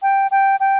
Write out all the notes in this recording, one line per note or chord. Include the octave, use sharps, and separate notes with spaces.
G5
G5
G5